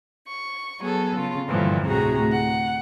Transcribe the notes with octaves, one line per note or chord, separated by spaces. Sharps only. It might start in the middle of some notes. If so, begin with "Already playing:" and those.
C#6
F#3 B3 G#4 A4
C#3 F4
G2 A#2 D3 E3 F3
D2 A2 C3 F#4 G#4 A#5
F#5